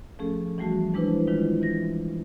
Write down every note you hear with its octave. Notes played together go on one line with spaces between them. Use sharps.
F3 A3 C#4 G#4 A4
E3 F3 G3 A3 F#4 A5
E3 G#3 D4 E4 B4 C5
D#3 G#3 E4 F4
E3 A#6